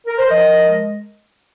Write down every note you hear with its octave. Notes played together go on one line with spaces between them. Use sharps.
A#4
C5
F3 A#4 D#5
F3
G#3